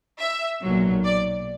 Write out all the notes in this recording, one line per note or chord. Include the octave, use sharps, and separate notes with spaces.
E5
B1 A#2 F#3
D5